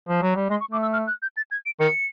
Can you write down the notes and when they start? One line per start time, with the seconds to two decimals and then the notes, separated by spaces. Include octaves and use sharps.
0.09 F3
0.22 F#3
0.36 G3
0.50 G#3 C6
0.60 C#6
0.71 A3 D6
0.82 E6
0.93 F6
1.07 F#6
1.22 G6
1.37 A6
1.51 G#6
1.66 D7
1.80 D#3 C#7